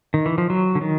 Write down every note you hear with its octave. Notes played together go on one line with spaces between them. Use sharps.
D#3
E3
F3
F#3
D3
D#3